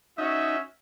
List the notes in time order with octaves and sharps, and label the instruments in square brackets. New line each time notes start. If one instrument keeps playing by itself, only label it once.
[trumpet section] C#4 F#4 E5 [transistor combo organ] D#4